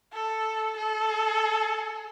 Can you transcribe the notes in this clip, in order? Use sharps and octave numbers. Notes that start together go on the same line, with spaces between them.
A4
A4